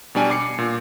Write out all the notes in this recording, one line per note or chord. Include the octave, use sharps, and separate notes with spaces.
B2 G3 D4 G#5
D6 C7 C#7
A#2